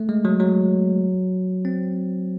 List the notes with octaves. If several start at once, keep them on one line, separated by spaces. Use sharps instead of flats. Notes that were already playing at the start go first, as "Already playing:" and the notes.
Already playing: A3
G#3
F#3
F#3
C4